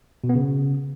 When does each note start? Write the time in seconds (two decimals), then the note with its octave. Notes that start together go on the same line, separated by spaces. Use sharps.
0.24 B2
0.29 B3
0.35 C#3